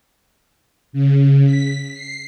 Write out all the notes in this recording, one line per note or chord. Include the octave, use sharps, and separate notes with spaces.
C#3
B6
C7